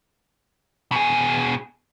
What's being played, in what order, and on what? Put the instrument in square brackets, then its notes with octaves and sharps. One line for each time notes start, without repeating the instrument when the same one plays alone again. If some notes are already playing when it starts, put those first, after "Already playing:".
[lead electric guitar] B2 G#4